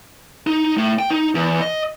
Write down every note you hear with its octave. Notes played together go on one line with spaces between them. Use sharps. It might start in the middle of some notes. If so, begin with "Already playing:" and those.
D#4
A2
G5
D#4
E2
D#5